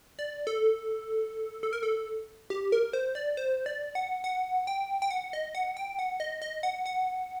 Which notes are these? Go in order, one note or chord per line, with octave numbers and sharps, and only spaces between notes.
D5
A4
A4
A#4
A4
G4
A#4
C5
D5
C5
D5
F#5
F#5
G5
G5
F#5
D#5
F#5
G5
F#5
D#5
D#5
F#5
F#5